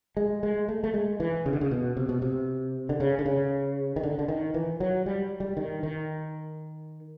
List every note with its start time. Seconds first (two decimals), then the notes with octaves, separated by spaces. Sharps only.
0.17 G#3
0.43 G#3
0.69 A3
0.84 A3
0.94 G#3
1.20 E3
1.46 C#3
1.53 D3
1.61 C#3
1.71 B2
1.97 C3
2.09 B2
2.22 C3
2.89 D3
3.00 C#3
3.19 D3
3.26 C#3
3.96 D#3
4.03 D3
4.19 D3
4.28 D#3
4.54 E3
4.80 F#3
5.06 G3
5.40 G3
5.57 D#3
5.83 D#3